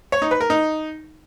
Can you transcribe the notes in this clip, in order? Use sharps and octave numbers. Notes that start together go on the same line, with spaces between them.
C#5
D#4
B4
A#4
D#4